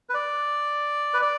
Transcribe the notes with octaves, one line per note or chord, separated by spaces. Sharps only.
B4
D5
B4
D5